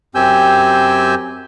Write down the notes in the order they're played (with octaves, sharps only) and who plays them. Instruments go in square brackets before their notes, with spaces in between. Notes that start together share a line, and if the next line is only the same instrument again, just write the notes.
[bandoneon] F#2 C4 G4 G#5 E6 G6